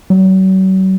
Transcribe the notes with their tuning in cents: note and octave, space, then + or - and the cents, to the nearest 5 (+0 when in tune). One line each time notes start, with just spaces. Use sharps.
F#3 +40